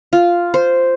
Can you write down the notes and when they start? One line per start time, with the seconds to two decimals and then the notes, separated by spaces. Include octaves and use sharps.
0.13 F4
0.54 C5